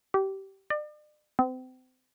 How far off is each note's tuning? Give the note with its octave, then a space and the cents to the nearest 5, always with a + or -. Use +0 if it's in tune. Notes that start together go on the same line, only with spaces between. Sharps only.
G4 -20
D5 +40
C4 -35